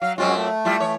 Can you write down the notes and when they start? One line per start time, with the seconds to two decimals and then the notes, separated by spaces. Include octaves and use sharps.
0.02 F#3 F5
0.18 F#2 G#3 C4 C#4 F4 F#4
0.35 A3
0.65 G3 E4 F4
0.80 E3 C#5